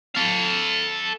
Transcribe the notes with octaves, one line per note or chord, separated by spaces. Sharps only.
A4 F5